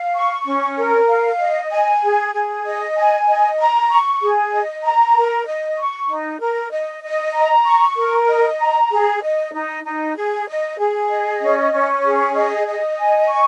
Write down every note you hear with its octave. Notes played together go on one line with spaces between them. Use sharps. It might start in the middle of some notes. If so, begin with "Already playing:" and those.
Already playing: F5
C#6
C#4
A#4
F5
D#5
G#5
G#4
G#4
D#5
G#5
D#5
A#5
C#6
G#4
D#5
A#5
A#4
D#5
C#6
D#4
A#4
D#5
D#5
A#5
C#6
A#4
D#5
A#5
G#4
D#5
D#4
D#4
G#4
D#5
G#4
D#5
C#4
C#4
G#4
D#5
D#5
G#5
C#6